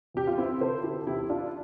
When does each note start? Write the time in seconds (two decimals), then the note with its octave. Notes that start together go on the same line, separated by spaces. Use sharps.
0.14 E2 G4
0.27 F4
0.38 C4 E4
0.61 D3 A4 C5
0.84 E4 G4
1.02 A4
1.07 E2 E4 G4
1.30 D4 F4